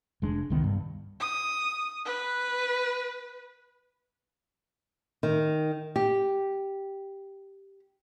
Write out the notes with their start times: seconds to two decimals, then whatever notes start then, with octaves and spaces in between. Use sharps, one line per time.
0.22 F1 G#3 D4
0.50 C2 D#3 B3
0.64 G2
1.20 D#6
2.06 B4
5.23 D#3
5.96 G4